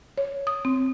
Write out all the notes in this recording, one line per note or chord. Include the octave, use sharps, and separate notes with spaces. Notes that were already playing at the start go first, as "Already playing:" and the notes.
C#5
D#6
C4